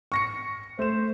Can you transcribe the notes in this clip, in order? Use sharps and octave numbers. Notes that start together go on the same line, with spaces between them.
C#6 A#6 C#7
A3 C5 E7